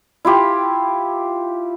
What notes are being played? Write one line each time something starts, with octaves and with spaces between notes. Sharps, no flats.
E4 F4 G4